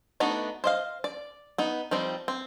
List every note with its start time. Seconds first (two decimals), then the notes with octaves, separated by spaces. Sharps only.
0.20 A3 B3 D4 D#4 F#4
0.64 C5 D#5 F5
1.04 D5
1.58 B3 D#4
1.91 F3 G3 C4 D#4
2.28 C4